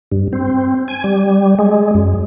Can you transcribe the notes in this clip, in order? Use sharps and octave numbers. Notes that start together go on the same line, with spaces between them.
G2
C4
G#5
G3
G#3
F#2